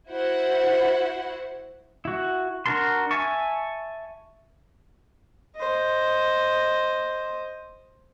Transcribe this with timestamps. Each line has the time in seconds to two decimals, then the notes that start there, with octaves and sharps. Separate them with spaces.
0.10 E4 F#4 C5 F#5
2.05 E4 F#4
2.66 D4 F#4 A#4 A5 C6
3.11 E5 G#5 A5 C#6
5.56 C5 D#5